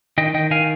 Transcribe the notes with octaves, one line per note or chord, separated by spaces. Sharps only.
D#3 D#5 G5
D#3 D#5 G5
D#3 F5 G#5